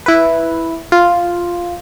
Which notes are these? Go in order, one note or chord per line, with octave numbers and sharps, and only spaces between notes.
E4 B4
F4